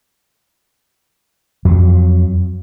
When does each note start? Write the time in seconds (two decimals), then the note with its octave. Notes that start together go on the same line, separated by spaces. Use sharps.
1.65 F2 F#3